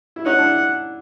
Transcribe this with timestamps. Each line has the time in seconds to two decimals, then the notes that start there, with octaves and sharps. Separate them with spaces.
0.16 E4
0.26 C#4 D#4 F#5
0.39 D4 E4